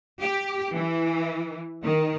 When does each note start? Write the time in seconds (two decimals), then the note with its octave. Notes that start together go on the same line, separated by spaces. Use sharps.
0.20 G4
0.74 E3
1.83 D#3